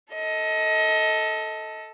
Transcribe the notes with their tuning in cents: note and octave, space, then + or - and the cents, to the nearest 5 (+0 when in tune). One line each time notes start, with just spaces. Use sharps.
A4 +0 D#5 +25